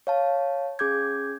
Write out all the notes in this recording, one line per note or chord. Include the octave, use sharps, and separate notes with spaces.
C#5 F5 A5
C#4 G#4 D6 G6 G#6